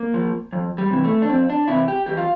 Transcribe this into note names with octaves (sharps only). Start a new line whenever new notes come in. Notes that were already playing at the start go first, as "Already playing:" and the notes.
Already playing: A#3
F3
F2
G3
C3 E3
A3
D4
F2 C4
D4
C3 E3 E4
G4
E2 G4
F4